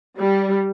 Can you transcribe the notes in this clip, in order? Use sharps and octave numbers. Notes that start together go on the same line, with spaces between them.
G3